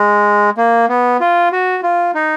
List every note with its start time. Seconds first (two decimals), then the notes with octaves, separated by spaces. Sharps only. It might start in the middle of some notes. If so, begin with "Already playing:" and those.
Already playing: G#3
0.57 A#3
0.89 B3
1.20 F4
1.52 F#4
1.83 F4
2.15 D#4